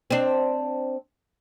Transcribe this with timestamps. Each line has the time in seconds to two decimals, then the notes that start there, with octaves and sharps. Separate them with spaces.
0.11 C4 D4